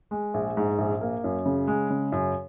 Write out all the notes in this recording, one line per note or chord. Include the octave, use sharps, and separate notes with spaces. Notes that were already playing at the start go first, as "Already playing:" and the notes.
G#3
A#1
G#2
A#1
A#3
F#2
C#3
G#3
C#3
F#2